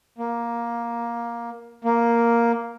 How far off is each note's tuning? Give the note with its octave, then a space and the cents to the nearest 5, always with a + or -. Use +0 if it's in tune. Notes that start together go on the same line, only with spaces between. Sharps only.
A#3 +10
A#3 +5